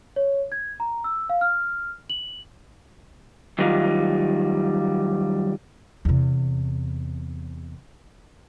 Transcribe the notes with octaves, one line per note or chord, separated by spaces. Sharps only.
C#5
G#6
A#5
E6
F5
F6
F#7
D#3 F#3 G3 D#4 F4
E2 C3